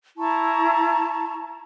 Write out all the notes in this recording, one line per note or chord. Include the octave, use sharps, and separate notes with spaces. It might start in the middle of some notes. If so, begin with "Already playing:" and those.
E4 A5 A#5 C#6